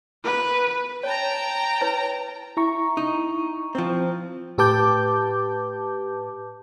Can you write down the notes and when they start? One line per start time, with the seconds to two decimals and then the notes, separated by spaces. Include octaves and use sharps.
0.24 B4
1.03 C#5 G5 A5 A#5
1.81 E4 B4 C#5
2.57 E4 A#5 C#6
2.97 D#4
3.75 F3 C4
4.58 A2 G4 B4 A5 D6 G6